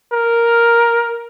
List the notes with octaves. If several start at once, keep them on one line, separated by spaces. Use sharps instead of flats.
A#4